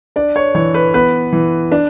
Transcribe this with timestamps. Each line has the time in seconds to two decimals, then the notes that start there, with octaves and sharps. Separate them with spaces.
0.16 D4 D5
0.36 C#5
0.55 E3 C#5
0.74 B4
0.94 B3 B4
1.33 E3
1.72 D4